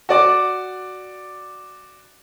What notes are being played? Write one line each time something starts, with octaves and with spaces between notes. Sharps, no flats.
F#4 D5 D6